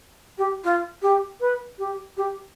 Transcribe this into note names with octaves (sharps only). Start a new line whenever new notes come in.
G4
F4
G4
B4
G4
G4